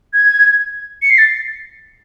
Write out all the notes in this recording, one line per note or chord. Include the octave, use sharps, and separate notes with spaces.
G#6
C#7
C7
A6